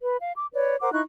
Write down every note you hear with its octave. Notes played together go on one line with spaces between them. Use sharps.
B4
F5
D6
B4 C#5 D5
A#4 C5 F#5 D6
D#4 E4 C#6 F#6